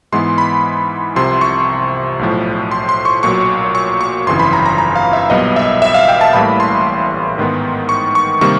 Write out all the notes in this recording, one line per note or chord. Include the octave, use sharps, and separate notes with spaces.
G#2 E3 G#3 B3 C6
B5
C2 C3 F3 C6
C#6
B1 A2 F3
C6
C6
C#6
B1 A#2 F#3 C#6
C#6
C#6
G1 F2 C#3 E3 C6
B5
A#5
A#5
A#5
F5
E5
B1 A#2 G3 B3 D#5
E5
E5
F5
G5
A5
A1 A2 E3 G3 A#3 B5
C6
G#2 D#3 G#3 B3
C#6
C#6
C3 D#3 G3 A#3 C#6